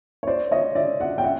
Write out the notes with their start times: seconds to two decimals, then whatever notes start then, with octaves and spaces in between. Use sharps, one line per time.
0.23 C#5
0.27 C5 D5
0.51 C#5 D#5
0.75 D5 E5
1.00 E5 F#5
1.18 G5
1.24 E5 F#5